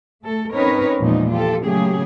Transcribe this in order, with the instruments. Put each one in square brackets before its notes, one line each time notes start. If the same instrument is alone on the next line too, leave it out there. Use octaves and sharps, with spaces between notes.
[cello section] A3 A4
C4 C#4 D#4 A#4 B4 C#5
E2 A#2 F3 G#3 D#4
F4 G4 A4
C#3 F#3 A3 A#3 G4 G#4